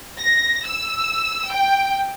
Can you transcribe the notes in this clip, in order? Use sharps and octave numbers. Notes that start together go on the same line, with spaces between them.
A#6
E6
G5